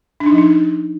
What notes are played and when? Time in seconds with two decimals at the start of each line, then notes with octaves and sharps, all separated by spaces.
0.20 D4
0.26 D#4
0.32 F3
0.38 D#4